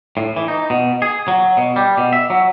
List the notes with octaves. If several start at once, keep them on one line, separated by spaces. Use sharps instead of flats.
A2
E3
D#4
B2
G#4
F#3
B2
G3
B2
E5
F#3